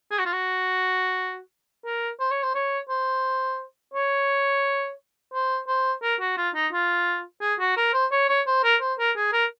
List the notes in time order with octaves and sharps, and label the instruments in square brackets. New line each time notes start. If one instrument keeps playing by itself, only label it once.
[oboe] G#4
F#4
F4
F#4
A#4
C5
C#5
C5
C#5
C5
C#5
C5
C5
A#4
F#4
F4
D#4
F4
G#4
F#4
A#4
C5
C#5
C#5
C5
A#4
C5
A#4
G#4
A#4